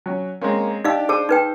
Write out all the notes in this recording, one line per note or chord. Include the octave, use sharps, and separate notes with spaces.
F#3 C#4
G#3 A#3 C4 C#4
D4 D#4 G4 D#5 F5 E6
G#4 C5 A5 E6
D#4 B4 G5